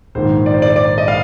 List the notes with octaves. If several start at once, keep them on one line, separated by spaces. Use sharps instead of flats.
A#1 G#2 D#3 C5
D5
C5
D5
D5
D#5
F5